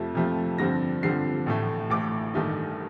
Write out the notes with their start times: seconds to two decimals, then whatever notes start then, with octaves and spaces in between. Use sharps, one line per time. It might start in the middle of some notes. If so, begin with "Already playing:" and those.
Already playing: F2 C3 F3 A3
0.15 F2 C3 F3 A3
0.58 G2 D3 F3 C4 A#6
1.03 G2 D3 F3 C4 C7
1.46 A1 A2 A3
1.90 A1 A2 A3 D6
2.34 A1 G2 D#3 A3 D#4